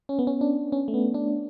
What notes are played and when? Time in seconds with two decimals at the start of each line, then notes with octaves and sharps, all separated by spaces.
0.09 C#4
0.19 B3
0.27 C#4
0.41 D4
0.72 C#4
0.88 A3
0.94 B3
1.14 D4